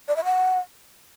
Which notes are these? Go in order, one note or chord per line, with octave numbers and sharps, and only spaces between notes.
D5
E5
F#5